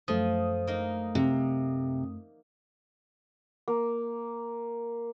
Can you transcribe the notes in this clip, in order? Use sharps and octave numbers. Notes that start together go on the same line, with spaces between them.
F#2 F3 A3 D#6
A#3 D#4
C3
A#3